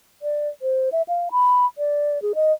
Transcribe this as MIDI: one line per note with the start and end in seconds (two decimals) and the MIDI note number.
0.22 0.48 74
0.62 0.89 72
0.92 1.02 76
1.08 1.29 77
1.31 1.66 83
1.78 2.21 74
2.22 2.32 68
2.35 2.52 75